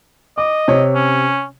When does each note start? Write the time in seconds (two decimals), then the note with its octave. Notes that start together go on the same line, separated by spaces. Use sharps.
0.38 D#5 D6
0.68 C3 C#5
0.95 C#4